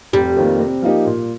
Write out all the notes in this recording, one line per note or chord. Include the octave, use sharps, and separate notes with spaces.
F1 G3
F2 D#3 A#3
C3
F3 A#3 D#4 G4
A#2